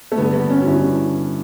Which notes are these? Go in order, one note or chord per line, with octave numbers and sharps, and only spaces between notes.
A3
G2 D3 B3
B3
C#4
F#4
G2 D3 E4